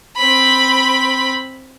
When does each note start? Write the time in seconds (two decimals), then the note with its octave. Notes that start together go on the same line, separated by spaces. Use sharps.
0.16 C4 B5